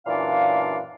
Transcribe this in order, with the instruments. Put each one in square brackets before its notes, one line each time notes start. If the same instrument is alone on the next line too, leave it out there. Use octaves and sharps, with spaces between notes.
[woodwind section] F#2 A#2 E3 D4 D5 F5